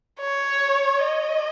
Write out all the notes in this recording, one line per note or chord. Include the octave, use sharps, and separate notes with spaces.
C#5
D#5